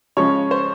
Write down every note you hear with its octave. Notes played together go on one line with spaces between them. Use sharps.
C#3 F3 G#3 C#4 C#5
C5